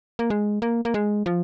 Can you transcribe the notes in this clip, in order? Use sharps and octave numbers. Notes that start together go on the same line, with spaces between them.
A#3
G#3
A#3
A#3
G#3
F3